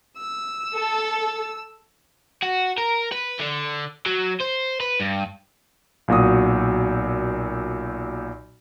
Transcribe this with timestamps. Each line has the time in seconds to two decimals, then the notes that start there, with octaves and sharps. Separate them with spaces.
0.17 E6
0.75 A4
2.42 F#4
2.78 A#4
3.12 B4
3.40 D3
4.06 F#3
4.40 C5
4.80 B4
5.00 G2
6.08 B1 A#2 F#4 D#6